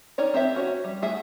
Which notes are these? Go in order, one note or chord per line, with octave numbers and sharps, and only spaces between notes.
D#4 A#4 C#5 D5
C4 G4 C5 E5
C#4 F#4 C#5
G3
A3 G#4 E5 F#5